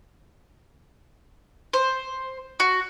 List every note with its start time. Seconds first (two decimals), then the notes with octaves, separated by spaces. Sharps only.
1.73 C5
2.60 F#4